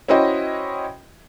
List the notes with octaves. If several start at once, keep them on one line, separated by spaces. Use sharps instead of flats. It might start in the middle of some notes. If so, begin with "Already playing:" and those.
C#4 E4 F#4 C5 D#5 G5